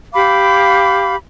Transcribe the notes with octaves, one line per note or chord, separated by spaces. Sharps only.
G4 F5 B5 D6